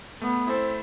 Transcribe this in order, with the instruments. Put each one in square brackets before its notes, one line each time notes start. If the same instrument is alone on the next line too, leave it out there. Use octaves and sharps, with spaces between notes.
[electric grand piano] A3 [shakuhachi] B3
[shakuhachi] C4 [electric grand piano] E4 A4 C5